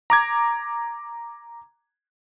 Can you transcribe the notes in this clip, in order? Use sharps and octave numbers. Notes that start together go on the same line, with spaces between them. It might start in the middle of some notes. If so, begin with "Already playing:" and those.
A#5 D6 G#6